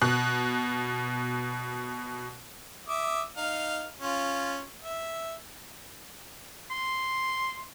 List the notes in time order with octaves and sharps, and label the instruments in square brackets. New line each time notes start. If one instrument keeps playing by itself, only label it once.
[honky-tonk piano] B2 F#6
[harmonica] E5 D6 D#6
D#4 F5
C#4 F4
E5
[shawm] C6